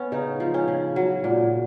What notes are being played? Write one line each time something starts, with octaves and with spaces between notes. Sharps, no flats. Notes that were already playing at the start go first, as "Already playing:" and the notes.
Already playing: B3 C#4
C#3 D#4
F3
C#4
C#3
F#3
A#2